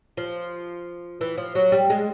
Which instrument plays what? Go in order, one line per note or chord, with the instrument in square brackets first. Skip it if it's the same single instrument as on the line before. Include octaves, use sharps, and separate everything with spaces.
[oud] F3
E3
F3
F#3
G3
G#3